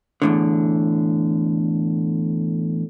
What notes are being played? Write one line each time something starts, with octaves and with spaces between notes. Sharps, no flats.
E2 A2 D3